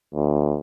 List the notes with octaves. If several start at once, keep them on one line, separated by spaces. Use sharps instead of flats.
D2